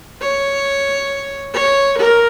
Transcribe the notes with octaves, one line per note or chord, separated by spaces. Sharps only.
C#5
C#5
A#4